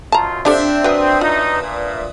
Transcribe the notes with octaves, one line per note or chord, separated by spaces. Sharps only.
F#2 B2 F4 A5 A#5
F3 C4 D4 G4 A4 E5
F#3 B4 E5 G5 D#6
F#2 D#4 F4
A#2